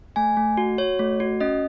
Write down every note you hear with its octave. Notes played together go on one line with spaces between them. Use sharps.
A3 G#5
A3
F#4
F#4 C#5
A3
F#4
C#4 D#5